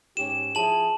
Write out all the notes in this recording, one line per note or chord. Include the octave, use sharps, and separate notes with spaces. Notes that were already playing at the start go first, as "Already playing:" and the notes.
G#2 C#4 G4 E7
F3 E4 G#4 A5 F#7